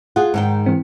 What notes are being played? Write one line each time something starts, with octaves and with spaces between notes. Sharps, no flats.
F4 G#4 F#5
G#2 D#3 G5
E3 C4